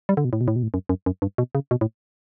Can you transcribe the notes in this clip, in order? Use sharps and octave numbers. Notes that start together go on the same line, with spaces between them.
G3
D3
B2
A2
B2
A2
B2
A2
F#2
F#2
F#2
G2
B2
C#3
B2
A2